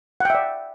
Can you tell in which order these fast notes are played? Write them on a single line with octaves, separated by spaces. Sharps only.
F#5 G5 E5 D5